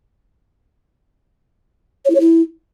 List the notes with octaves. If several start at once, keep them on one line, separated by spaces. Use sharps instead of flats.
C#5
E4
C#5
E4